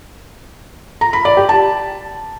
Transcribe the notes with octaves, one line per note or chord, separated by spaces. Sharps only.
A#5
B5
D5
G4
A5